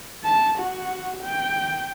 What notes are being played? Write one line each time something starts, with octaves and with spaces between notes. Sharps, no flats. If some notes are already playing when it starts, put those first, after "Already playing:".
A5
F#4
G5